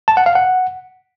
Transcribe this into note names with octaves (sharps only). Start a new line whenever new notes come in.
A5
F#5
F5
F#5